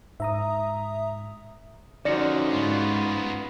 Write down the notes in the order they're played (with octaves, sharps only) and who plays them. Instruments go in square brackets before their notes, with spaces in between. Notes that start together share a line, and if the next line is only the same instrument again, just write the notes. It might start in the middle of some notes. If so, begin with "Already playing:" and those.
[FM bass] G#2 [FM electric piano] E5 A#5 D#6
[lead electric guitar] D3 F3 [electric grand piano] C#4 D#4 F#4 [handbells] D5 A#6 C#7
[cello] G#2 [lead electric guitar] B3 F4